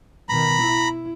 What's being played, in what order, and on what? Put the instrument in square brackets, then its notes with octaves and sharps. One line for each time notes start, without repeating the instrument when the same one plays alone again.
[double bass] B2 D#3 [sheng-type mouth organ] A#5 B5
[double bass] E4